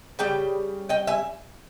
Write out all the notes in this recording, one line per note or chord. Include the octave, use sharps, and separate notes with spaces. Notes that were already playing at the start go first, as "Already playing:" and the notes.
C#3 G3 G5
D#5 G5
E5 G#5